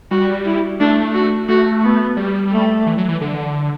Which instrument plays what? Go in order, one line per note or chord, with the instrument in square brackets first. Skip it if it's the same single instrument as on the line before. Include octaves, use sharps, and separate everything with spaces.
[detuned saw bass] G3 [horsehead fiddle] F#4
[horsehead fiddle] E4
[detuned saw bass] A3 [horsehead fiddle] D4
[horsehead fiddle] F#4
[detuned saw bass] A3 [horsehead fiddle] F#4
[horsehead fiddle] B3
[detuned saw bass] G3
[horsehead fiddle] A3
[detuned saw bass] E3
F#3
E3
D3